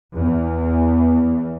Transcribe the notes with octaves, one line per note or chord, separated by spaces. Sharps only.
E2